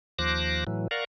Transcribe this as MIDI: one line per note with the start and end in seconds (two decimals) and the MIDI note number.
0.19 0.64 39
0.19 0.64 53
0.19 0.64 72
0.19 0.64 86
0.19 0.64 90
0.19 0.64 94
0.67 0.88 45
0.67 0.88 52
0.67 0.88 54
0.91 1.04 70
0.91 1.04 74
0.91 1.04 77
0.91 1.04 78
0.91 1.04 82
0.91 1.04 85